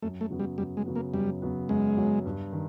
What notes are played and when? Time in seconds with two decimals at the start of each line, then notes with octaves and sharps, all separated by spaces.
0.02 F#2 A3
0.21 A3
0.30 C#3 F#3 B3
0.40 G3
0.58 F#2 G3
0.77 G#3
0.86 C#3 F#3 B3
0.96 A#3
1.13 F#2 G3
1.42 C#3 F#3 B3
1.69 F#2 G#3
1.98 C#3 F#3 B3
2.25 G2
2.52 D#3